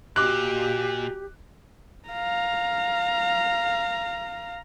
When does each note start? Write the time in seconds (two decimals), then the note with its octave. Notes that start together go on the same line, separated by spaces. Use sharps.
0.16 A#2 F#4 G4 D#5 D6 F#6
2.09 F5 A#5